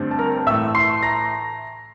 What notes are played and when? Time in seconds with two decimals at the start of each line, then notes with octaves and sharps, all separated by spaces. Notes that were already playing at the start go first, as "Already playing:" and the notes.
Already playing: G2 D3 A3 C4
0.11 A5
0.19 A#4 A#5
0.47 A2 E3 A3 E5 E6
0.75 C6 C7
1.03 A#5 A#6